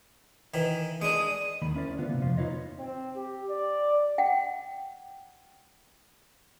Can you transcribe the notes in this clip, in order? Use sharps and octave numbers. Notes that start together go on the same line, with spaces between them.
D#3 E3
G#3 D4 D#6
D#2 D#3 A#3 B5
C#4 E4 A#4 C5 D5
D3 B3 F4
C3 A#3
F2 C3 F3 F4 C5
D#4 F4 B4 C#5 D#5
C4
G4
D5
F#5 G5